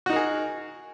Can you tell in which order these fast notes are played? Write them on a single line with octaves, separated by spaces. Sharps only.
F#4 D#4 A#4 G#4